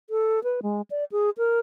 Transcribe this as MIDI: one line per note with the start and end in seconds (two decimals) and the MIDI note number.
0.10 0.43 69
0.43 0.60 71
0.62 0.81 56
0.90 1.04 74
1.12 1.30 68
1.38 1.59 70